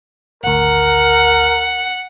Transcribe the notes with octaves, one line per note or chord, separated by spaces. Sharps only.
G#1 D2 A#4 F#5